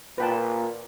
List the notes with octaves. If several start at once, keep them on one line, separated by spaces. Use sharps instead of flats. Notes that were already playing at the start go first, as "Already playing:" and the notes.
A#2 B4 G5 A5